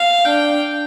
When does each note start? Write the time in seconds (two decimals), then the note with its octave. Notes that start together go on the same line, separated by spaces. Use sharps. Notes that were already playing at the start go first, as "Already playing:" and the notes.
Already playing: F5
0.25 D4 G5